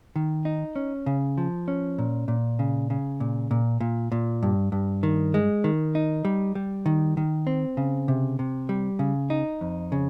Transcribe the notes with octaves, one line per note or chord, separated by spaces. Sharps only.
D#3
D#4
C#4
C#3
F3
C#4
A#2
A#2
C#3
C#3
A#2
A#2
A#2
A#2
G2
G2
D#3
G#3
D#3
D#4
G3
G3
D#3
D#3
C4
C#3
C3
C3
G3
C#3
D#4
F2
C#3